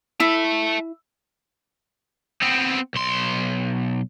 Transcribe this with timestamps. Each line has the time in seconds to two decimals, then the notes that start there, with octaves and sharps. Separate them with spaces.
0.20 E4 E5 A5
2.42 B3 C4
2.94 B1 C6